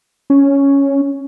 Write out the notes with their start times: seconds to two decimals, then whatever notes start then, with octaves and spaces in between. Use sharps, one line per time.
0.30 C#4